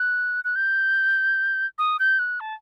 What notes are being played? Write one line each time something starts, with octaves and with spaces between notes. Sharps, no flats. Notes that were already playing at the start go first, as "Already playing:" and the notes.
Already playing: F#6
F#6
G6
D#6
G6
F#6
A5